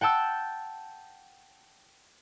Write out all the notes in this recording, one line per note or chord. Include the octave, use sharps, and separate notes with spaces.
F#5 G5 A5 E6 G6